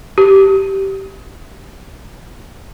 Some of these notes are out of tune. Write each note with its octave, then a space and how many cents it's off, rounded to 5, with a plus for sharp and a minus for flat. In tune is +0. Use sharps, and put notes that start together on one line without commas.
G4 -15